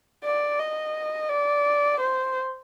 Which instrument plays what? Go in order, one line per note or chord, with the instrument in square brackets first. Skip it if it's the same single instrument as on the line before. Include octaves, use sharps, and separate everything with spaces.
[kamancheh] D5
D#5
D5
C5